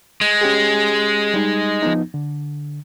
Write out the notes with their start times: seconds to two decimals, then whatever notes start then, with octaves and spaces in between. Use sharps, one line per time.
0.21 G#3
0.41 C#4 G4 G#4
1.34 G3 D#4
1.82 F3 B3 D#4
2.14 D3